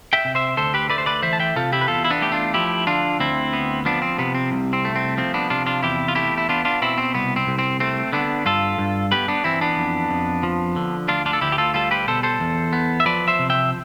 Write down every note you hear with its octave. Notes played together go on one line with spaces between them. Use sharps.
E5 G5
C3
C5 E5
D2 A4 C5
G4 B4
A3 B4 D5
C5
B4 D5
E3 C5 E5
A5
E5 G5
C3 F4 A4
E4 G4
B4
E2 F4 A4
E4
B3 D4
A3 G4
D4 F4
F3 E4 G4
D3 D4 F4
D2 C4 E4
B3
F3 B3 D4
C4
C3 B3
C4
C2
C4
A3
C4
F3 C4
B3 D4
C3 D4 F4
D4 F4
E2 E4 G4
F4
A3 E4 G4
E4
B3 D4 F4
D4 F4
B2 C4 E4
C4
C2 B3
C4
C2
C4
A3 C4
D3 B3 D4
G2 F4 A4
G2
B3 G4 B4
B3 D4
E3 C4 E4
B3 D4
F2
F2
F3
D3
D2 D4 F4
D4 F4
A4
D2 E4 G4
G4
F4 A4
G3 F4 A4
G4 B4
B2 A4 C5
A4 C5
E2
B3
E5
F3 B4 D5
C5 E5
C3
E5 G5